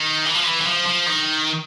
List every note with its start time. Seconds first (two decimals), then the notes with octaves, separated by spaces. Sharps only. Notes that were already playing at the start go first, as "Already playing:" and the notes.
Already playing: D#3
0.25 E3
0.35 F3
0.44 E3
0.61 E3
0.66 F3
0.86 F3
1.06 D#3